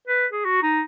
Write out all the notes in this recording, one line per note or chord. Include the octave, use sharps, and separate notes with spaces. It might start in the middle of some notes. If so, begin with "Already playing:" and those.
B4
G#4
F#4
D#4